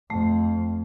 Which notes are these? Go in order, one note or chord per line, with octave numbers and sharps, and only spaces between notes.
F2 A3